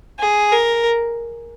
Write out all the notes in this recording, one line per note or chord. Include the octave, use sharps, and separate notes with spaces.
G#4
A#4